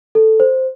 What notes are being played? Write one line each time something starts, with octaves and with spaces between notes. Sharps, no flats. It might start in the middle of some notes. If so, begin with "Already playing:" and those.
A4
C5